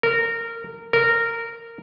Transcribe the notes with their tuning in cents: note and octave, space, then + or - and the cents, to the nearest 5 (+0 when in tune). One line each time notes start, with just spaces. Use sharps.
A#4 -20
A#4 -15